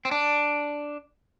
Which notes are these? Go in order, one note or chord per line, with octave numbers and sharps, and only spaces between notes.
C4
D4